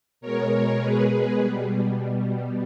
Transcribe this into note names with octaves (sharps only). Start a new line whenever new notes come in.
B2 G#3 A#4 C#5
B2 G#3 G#4 B4
B2 G3
B2 G3